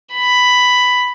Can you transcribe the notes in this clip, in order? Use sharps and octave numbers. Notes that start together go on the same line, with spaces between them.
B5